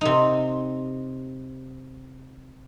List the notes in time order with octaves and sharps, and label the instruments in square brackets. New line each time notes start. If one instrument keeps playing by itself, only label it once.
[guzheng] C3 D#4